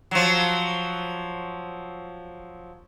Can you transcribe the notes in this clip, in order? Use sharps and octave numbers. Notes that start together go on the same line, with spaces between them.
F3 F#3